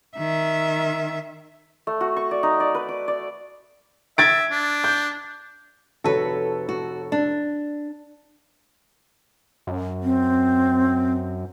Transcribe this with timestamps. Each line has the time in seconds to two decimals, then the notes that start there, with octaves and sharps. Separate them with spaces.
0.17 D#3 E5
1.87 A3
2.01 F#4
2.17 C#6
2.31 D5
2.43 D#4
2.60 D5
2.75 B4
2.89 D6
3.08 D5
4.18 E5 G#6 A6 D7
4.51 D4
4.84 G6
6.04 F1 F#4 A4 B4 C#5
6.69 F#4
7.12 D4
9.67 F#2
10.03 C4